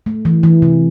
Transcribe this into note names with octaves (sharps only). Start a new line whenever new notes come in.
A3
E3
E3
C3